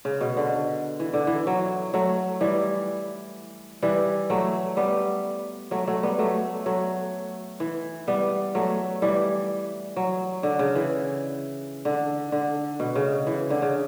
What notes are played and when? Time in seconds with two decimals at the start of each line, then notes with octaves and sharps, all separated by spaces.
0.05 C#3
0.21 B2
0.37 D3
1.00 E3
1.13 D3
1.27 E3
1.47 F#3
1.94 F#3 A3
2.41 E3 G3
3.82 E3 G3
4.30 F#3 A3
4.77 G3 B3
5.71 F#3 A3
5.87 F#3 A3
6.03 G3 B3
6.19 F#3 A3
6.66 F#3 A3
7.60 E3
8.08 G3 B3
8.55 F#3 A3
9.02 E3 G3
9.96 F#3
10.43 D3
10.59 C#3
10.75 E3
11.85 D3
12.32 D3
12.80 B2
12.95 C#3
13.27 E3
13.50 D3
13.62 C#3